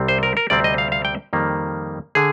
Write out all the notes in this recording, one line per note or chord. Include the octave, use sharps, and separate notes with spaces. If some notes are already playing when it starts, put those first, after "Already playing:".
Already playing: C2 C3 G3 C4
C5
A#4
A#4
D2 C3 G3 C4 D5
D#5
F5
F5
G5
F2 D#3 G3 A#3
D3 G#4